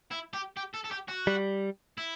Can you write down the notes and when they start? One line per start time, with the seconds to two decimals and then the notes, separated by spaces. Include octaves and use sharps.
0.11 E4
0.33 G4
0.57 G4
0.75 A4
0.85 A4
0.92 G4
1.09 F#4
1.27 G3
1.98 E4